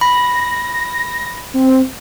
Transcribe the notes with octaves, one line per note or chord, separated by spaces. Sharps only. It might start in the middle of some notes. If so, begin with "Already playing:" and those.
B5 A#6
C4